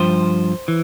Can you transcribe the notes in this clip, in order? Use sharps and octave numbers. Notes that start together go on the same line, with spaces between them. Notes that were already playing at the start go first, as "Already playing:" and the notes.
Already playing: G2 F3 C5
E3